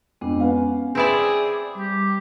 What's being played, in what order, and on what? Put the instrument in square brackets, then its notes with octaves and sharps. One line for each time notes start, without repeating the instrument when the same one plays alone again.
[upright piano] F2 [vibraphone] G#3 B3 D4
[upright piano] B3 C#4 F5 [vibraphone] G#5
[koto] C4 E4 D5 [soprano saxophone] G#4 [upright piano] B4
[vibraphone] G3 D6 [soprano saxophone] G4